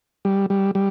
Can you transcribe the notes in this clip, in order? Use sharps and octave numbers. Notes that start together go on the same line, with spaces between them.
G3
G3
G3